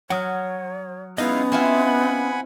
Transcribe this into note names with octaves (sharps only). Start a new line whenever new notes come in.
F#3 C#5 F#5 D#6 F6
G#3 B3 C#4 D#4 E4 D#5 F5
C4 E4 F4 F#5 G#5 B5